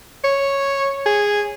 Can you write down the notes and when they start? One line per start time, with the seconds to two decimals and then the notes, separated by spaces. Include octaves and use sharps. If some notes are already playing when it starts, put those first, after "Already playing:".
0.24 C#5
1.06 G#4